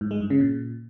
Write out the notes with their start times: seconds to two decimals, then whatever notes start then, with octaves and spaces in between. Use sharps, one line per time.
0.01 G#2
0.11 G#3
0.21 G2
0.30 C#3
0.40 A#2